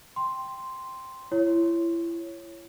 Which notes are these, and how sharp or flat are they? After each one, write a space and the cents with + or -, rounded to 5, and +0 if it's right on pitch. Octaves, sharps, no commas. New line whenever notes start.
G5 +0 C6 +0
E4 +30 C#5 +0